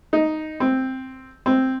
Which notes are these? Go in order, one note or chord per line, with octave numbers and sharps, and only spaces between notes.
D#4
C4
C4